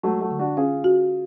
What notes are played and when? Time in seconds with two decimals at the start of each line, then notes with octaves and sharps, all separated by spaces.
0.03 F#3 G#3 A3
0.21 F#3 A3
0.31 D3
0.39 D4 F#4
0.57 C#4 F4 G#4
0.84 F#4